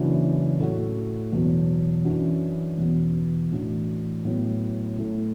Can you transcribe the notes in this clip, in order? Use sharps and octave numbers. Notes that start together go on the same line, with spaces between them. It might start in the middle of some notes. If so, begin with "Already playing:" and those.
Already playing: F#1 F#2 E3 D4 F#4
A2 A3 F#4
E2 B2 F#3
F#2 E3 D4 F#4
E2 B2 B3 F#4
A2 E3 D4 F#4
A2 F#3 B3 F#4
A2 A3 E4